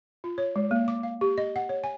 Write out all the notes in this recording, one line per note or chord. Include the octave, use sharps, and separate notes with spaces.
F4
C#5
G#3
A#3
D6
F5
G4
D#5
F#5
C#5
G#5